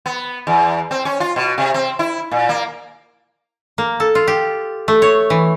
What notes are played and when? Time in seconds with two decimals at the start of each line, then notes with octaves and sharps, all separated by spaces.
0.06 B3
0.47 E2
0.91 C4
1.05 C#4
1.20 F4
1.36 B2
1.58 C3
1.74 C4
1.99 E4
2.31 A#2
2.49 A#3
3.78 A#3
4.00 A4
4.15 F4
4.28 G4
4.88 A3
5.02 C#5
5.30 E3